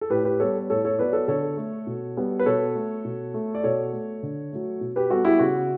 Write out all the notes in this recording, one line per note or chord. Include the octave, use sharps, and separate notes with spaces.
A4
A2 G4 B4
G4 B4
G3 B3 A4 C#5
A2 A4 C#5
A4 C#5
F#3 B3 B4 D5
A4 C#5
D3 A4 C#5
A3
B2
G3 B3
B4
B2 A4 C#5
A3
B2
A3
D5
B2 A4 C#5
A3
D3
F#3 A3
B2
G4 B4
G3 B3 F#4 A4
E4 G4
C#3 F#4